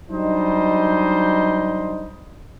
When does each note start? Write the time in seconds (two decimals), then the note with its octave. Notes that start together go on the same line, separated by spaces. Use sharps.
0.11 F#3 G3 D4 D#4 C5 D#5